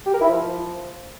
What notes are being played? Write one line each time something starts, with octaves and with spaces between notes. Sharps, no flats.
G4
A#4
E4
F3